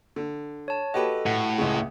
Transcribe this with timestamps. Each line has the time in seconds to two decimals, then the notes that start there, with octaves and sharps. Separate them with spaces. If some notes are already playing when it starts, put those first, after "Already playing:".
0.16 D3
0.68 C#5 A5
0.94 F#4 G4 A4 B4 D#5
1.26 A2 F#5
1.58 C#2 C#3